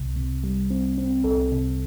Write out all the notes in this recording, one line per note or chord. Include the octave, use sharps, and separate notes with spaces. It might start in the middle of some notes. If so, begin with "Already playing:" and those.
Already playing: C2 C3
C3
G3
C4
C4
C2 A4
C3